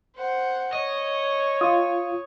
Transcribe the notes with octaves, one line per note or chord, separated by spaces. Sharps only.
C5 F#5
C#5 D#5
F4 D#6